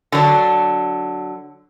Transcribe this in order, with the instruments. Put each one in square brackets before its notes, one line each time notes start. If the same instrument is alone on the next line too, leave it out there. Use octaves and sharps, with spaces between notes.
[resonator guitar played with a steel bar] D3 F#3 D4